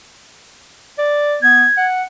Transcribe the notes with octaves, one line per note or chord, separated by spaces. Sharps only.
D5
B3 G#6
F#5